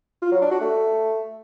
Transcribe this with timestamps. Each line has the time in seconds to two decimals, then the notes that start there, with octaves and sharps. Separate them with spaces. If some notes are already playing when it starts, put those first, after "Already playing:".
0.22 F4
0.32 F#3
0.42 D4
0.51 F#4
0.61 A3